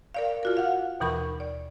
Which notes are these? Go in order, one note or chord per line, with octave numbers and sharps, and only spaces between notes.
A#4 D5 F5
F4 F#4 A#4
F5 F#5
D#2 B2 E3 A#4 B5 C#6
D5